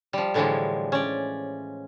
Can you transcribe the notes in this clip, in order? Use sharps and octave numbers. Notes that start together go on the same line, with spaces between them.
F3 G3
A2 D3 E3 F3 G3 G#3
C#4 D5